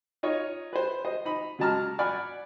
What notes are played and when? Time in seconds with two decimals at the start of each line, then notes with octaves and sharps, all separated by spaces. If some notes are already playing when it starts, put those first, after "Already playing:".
0.23 D#4 F4 C#5
0.73 B4 C5
1.05 C5 D#5
1.25 D#4 B5
1.59 C#3 F#3 G#3 A5 A#5 F6
1.99 D5 F#5 G#5 B5 F6